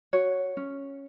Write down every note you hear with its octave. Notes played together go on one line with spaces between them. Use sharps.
F#4 C#5
C#4